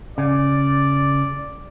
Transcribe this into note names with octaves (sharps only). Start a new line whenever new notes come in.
C#3 D5